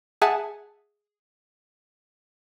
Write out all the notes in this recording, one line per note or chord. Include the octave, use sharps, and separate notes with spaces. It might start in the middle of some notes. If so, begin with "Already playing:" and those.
G#4 E5 F#5 G#5 A5